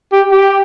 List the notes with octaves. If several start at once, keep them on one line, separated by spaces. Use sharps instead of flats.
G4
G4